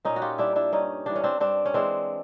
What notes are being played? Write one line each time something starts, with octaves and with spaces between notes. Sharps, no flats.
A#2 C#4 D#4
F#4
F4 G4
G3 D4 E4
D4 E4
G2 C#4 D#4
E3 G3 D4
C#4
C4 D4
G2 C4 D4
C#4
E3 G#3 C4 D4